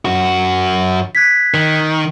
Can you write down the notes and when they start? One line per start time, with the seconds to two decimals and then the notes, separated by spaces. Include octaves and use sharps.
0.05 F#2 F#4
1.15 F#6 G#6 B6
1.54 D#3